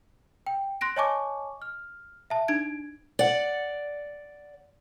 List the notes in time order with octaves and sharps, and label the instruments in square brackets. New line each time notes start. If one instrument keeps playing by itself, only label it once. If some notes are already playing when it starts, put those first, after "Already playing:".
[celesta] G5
C6 F#6 A#6 D7
C#5 D#5 G#5 A5 C#6 D6
F6
E5 A5
D4 D#4 G#6 D7
[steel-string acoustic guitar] D5 F#5